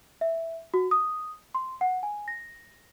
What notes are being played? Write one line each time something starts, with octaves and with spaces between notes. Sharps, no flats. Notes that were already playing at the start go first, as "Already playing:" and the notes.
E5
F#4
D#6
C6
F#5
G#5
A#6